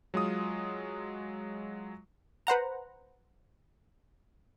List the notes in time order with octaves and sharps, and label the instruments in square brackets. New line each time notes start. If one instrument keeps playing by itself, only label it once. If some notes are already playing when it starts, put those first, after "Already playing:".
[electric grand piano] F#3 G#3 F4 D#6
[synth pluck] B4 C5 F#5 A#5